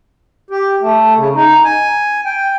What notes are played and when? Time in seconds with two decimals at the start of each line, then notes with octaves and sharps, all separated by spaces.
0.50 G4
0.82 A3
1.17 C#3
1.35 D#4
1.64 G#5
2.25 G5